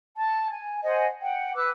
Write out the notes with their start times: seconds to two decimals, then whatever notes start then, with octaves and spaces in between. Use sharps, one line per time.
0.18 A5
0.51 G#5
0.84 C5 D#5 F#5 G#5
1.21 F#5 G5
1.55 B4 D6 E6 F#6